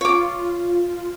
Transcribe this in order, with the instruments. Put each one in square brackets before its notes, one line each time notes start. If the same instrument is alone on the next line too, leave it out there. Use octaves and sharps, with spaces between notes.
[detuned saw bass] F4 [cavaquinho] C#5 D6